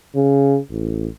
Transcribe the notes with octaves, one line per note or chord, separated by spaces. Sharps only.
C#3
A1